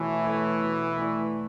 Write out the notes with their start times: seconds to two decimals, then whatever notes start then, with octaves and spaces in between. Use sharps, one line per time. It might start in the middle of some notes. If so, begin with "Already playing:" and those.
Already playing: B2 E3 A3 E4 A4 C#5
0.24 A3 E4 A4 C#5
0.62 B2
0.97 A3 E4 B4 D5